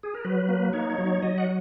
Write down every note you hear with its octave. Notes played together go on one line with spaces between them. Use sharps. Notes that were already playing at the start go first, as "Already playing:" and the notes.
G#4
A#4
F#3 B4
A#3
D#4 C#5
C#5
F#3
C#5
F#3 D#5
F#5